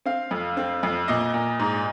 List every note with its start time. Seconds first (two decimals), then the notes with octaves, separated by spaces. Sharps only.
0.06 C4 F5
0.31 F2
0.57 C4
0.83 F2
1.08 A#2 D#5
1.34 A#2
1.59 G#2